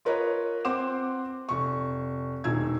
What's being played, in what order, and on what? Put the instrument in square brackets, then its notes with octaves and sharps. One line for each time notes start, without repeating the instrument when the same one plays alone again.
[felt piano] F4 A#4 B4 C#5 D#5
C4 C5 F#5 C6 D6 E7
F1 C#6
E1 D#3 E6 G#6